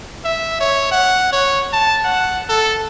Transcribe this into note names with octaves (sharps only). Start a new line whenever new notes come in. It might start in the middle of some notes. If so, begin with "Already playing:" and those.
E5
C#5
F#5
C#5
A5
F#5
A4